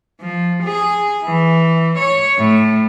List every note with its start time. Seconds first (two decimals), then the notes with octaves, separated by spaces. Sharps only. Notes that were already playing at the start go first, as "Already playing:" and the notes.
0.21 F3
0.64 G#4
1.25 E3
1.99 C#5
2.39 A2